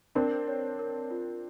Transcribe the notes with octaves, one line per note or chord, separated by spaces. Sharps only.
C4 D4 A#4
C#5
A#4
F4